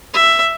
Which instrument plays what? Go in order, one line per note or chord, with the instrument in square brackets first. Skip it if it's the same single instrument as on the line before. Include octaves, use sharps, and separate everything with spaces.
[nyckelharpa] E5